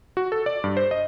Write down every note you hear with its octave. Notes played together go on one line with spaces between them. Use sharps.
F#4
A4
D5
G2
C5
D#5